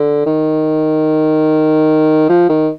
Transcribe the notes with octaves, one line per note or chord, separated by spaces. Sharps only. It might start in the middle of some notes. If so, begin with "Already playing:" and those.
Already playing: D3
D#3
F3
D#3